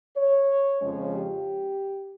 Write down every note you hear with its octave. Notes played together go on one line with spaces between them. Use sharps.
C#5
F2 C#3 F3 G#3 C#4 C#5
G4